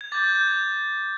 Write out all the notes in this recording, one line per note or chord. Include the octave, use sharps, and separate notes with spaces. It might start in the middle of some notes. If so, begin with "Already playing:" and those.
G#6
D6 G6 A6
G6
G6
G#6